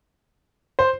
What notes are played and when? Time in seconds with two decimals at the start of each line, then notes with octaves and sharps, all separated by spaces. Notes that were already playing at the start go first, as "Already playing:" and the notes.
0.79 C5